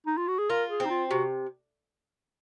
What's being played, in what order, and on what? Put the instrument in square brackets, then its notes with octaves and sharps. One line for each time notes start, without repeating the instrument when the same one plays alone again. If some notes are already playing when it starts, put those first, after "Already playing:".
[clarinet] D#4
F4
F#4
G#4
[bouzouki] F4 [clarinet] A#4
[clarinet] G#4
[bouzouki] C4
[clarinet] D#4
F4
[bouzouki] C3 [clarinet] F#4